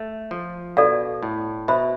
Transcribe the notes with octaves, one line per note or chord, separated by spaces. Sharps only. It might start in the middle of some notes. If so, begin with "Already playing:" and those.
Already playing: A3
F3
B2 A4 D5 F5
A2
B2 C5 E5 B5